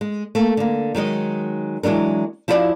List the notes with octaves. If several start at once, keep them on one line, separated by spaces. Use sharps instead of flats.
G#3
A3 A#3
D3 A#3
D#3 F#3 G#3 D#5
E3 F#3 G#3 D4 A#4
F3 E4 F#4 A4 D5 F5